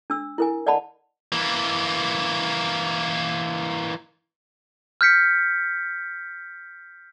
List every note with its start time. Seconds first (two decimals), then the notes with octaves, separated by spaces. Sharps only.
0.10 D4 E6
0.38 E4 A#4 G#5
0.67 D5 D#5 F#5 A5 B5
1.32 E3 A#3
5.01 F6 G6 B6 C#7